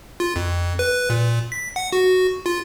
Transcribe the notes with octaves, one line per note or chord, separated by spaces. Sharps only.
F4
F2
B4
A#2
B6
F#5
F#4
F4